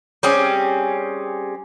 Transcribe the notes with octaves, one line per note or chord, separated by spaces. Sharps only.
G3 C4 C#4 G#4